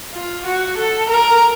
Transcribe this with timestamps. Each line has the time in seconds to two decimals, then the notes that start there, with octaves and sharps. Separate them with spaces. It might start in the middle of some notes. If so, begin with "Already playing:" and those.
0.14 F4
0.46 F#4
0.78 A4
1.10 A#4